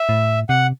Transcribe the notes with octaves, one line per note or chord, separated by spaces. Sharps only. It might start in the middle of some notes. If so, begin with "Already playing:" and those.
Already playing: E5
A2
C3 F#5